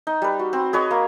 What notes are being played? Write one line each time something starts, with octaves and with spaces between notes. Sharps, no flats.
D#4
G3 B4
F#4
C4
G#4 B4 C#5 D#5
A#3